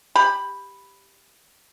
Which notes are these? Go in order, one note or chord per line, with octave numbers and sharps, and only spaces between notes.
G4 B5